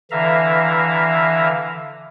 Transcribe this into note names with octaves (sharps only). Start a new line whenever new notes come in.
D3 E3 E5 F5 A#5